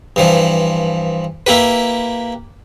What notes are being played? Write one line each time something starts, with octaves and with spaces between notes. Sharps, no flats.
G2 E3 F3
A#3 E4 G4 B4